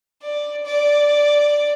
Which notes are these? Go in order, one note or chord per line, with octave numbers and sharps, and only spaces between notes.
D5
D5